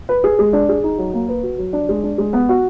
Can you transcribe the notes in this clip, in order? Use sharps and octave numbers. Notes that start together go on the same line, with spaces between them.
B4
G#4
G#3
D4
G#4
D#4
F#3
A#3
B4
F#4
F#3
D4
G#3
D4
G#3
B3
F#4